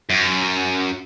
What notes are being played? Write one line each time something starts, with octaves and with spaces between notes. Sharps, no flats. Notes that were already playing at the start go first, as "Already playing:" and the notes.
F#2